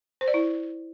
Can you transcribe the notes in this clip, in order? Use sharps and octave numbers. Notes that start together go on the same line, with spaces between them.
C5
D5
E4